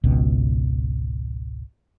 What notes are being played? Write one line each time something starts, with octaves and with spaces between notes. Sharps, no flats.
G#1 C#2 B2